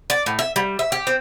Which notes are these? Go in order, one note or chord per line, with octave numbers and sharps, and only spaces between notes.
D5
A2
E5
G3
E5
G4
C4